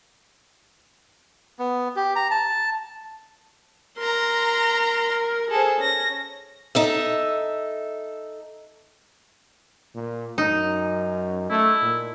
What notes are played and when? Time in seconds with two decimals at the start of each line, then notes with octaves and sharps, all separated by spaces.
1.59 B3
1.96 G4
2.16 A#5
2.31 A5
3.98 A#4 A#5 C6
5.51 G#4 A4 C5
5.81 C#4 A#6
6.75 D#4 A4 E5
9.95 A#2
10.38 F#2 D#4
11.50 A3 E4
11.82 A#2